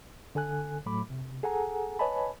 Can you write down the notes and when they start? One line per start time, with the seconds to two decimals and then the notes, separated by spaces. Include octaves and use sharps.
0.35 D3 A4 G#5 F#6
0.86 A2 F#3 A3 B5 D6
1.10 C3
1.43 G#4 A4 F#5 G#5 A#5
1.99 B4 C#5 D#5 G#5 A5 B5